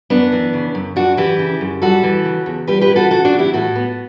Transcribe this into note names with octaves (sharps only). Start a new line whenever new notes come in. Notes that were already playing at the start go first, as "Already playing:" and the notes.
F#2 B3 D4
E3
C#3
F#2
F#2 D4 F#4
E3 E4 G4
C#3
F#2
G3 F#4 A4
E3
C#3
E2
G3 G4 B4
G4 B4
E3
F#4 A4
C#3 F#4 A4
D4 F#4
E2
E4 G4
A2 F#4 A4
B3